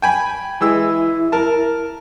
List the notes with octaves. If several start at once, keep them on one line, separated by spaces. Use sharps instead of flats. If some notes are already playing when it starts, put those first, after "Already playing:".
G5 G#5 B5
E3 G#3 E4 E6
A#4 A5